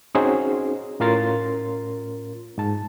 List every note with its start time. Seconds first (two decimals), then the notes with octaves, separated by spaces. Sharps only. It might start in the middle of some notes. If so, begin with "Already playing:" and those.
0.15 C4 C#4 D#4 F#4 G#4 C5
1.00 A2 C#4 F4 A#4 C6 A6
2.58 G#2 A5